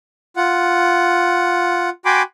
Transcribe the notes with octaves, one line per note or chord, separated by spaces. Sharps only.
F4 F#5
F#4 G5 G#5 B5 C6 D6